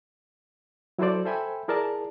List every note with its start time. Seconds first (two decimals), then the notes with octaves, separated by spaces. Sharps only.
0.99 F#3 E4 F#4 A4 C5 D5
1.25 A4 C5 E5 G5 G#5 B5
1.68 E4 G#4 A#4 D5 A5